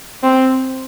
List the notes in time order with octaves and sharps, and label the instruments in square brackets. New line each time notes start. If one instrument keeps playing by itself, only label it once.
[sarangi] C4